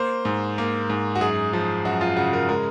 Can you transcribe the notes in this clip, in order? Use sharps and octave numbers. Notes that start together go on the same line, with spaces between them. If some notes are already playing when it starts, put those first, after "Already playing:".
Already playing: A#3 C5
G#2
A#3
G#2
F#4
F#2 G#4
F3
F#2 F#4
F4
C#3 F#4
A#4
G#3 A#4